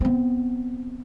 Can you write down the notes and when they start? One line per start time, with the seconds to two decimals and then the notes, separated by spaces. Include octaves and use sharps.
0.01 B3 C4